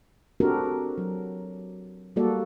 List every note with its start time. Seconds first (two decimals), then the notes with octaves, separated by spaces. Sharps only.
0.40 C4 D4 F#4 G4 A4 A#4
0.98 F#3
2.16 G3 A#3 F#4 A4 D5